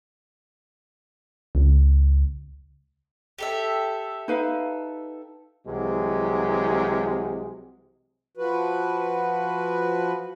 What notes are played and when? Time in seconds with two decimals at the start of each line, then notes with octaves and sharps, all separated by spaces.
1.55 C#2
3.38 G4 A4 E5
4.28 D#4 B4 F5
5.66 C2 C3 E3 F#3 G#3
8.37 F3 F#4 B4